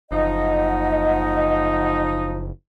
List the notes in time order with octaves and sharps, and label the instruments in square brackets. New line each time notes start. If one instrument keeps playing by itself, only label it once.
[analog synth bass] F#1 [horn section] F3 D#4 [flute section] D#5 F#5